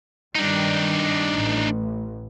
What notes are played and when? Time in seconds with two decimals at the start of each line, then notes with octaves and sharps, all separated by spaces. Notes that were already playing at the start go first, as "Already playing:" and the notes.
0.35 G2 D#3 G3 D4 D#4
1.32 A1